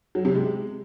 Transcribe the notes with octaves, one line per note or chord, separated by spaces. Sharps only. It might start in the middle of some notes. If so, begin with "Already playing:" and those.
F#3
C3
G#3